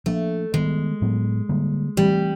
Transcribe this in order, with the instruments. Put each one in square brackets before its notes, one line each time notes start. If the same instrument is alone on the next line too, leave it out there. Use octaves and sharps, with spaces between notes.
[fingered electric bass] F3 A#3 D4 [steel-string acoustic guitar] A3
[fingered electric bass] D#3 G3 B3 [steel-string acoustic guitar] G#3
[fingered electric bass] A2 F#3 B3
D3 G3 A#3
[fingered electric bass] E3 A3 C4 [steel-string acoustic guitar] G3